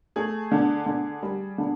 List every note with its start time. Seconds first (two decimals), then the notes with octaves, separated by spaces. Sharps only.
0.16 A3 G#4
0.52 D3
0.86 D3
1.23 G3
1.58 D3